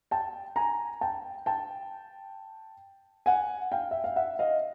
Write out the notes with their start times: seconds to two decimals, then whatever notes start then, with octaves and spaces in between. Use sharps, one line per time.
0.11 G5 A5
0.56 G#5 A#5
1.01 G5 A5
1.46 G5 A5
3.26 F#5 G#5
3.72 F5 G5
3.91 E5
4.04 F5
4.16 E5 F#5
4.39 D#5 F5